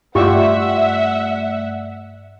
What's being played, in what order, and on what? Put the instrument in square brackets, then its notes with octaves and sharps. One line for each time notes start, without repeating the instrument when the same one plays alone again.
[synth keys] G2 A3 D5 [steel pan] F4 G4 C#6 [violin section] E5 F#5